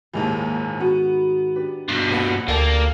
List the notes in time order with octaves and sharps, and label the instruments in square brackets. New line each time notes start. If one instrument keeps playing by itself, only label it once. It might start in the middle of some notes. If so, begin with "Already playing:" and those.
[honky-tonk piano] A#1 D#2 E3 [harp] G#2 D#3 G4
[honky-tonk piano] B3 [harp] F#4
[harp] D4 G4 B4
[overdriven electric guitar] G2 B2
[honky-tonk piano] A#1 B4 F#5 [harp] D#6
[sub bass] D2 [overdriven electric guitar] A#3 [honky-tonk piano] G4 A4 D5 [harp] C5 D#5 A5